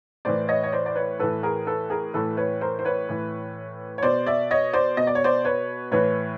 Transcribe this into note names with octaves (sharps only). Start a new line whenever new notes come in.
A2 E3 C5 D5
C#5 D#5
C#5
C5 D5
D5
B4 C#5
A2 E3 A4 B4
G#4 A#4
A4 B4
G#4 A#4
A2 E3 A4 B4
B4 C#5
A#4 C5
C5
B4 C#5
A2 E3
C#5
B2 C5 D5
D5 E5
C#5 D#5
C5 D5
B2 D#5
D5
C#5
C5 D5
B4 C#5
A2 E3 B4 C#5